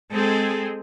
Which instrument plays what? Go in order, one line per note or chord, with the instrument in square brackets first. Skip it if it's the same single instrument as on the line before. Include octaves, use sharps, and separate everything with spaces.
[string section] G#3 C4 G#4 [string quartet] A4